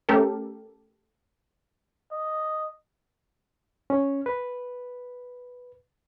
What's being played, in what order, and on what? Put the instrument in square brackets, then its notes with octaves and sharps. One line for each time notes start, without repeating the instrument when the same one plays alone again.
[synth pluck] A3 C#4 G4 A4 A#4
[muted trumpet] D#5
[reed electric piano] C#4
B4